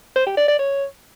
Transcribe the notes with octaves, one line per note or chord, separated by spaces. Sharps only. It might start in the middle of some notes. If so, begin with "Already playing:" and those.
C5
G4
D5
D5
C#5